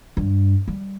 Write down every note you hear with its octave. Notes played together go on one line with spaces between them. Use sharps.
G2
G3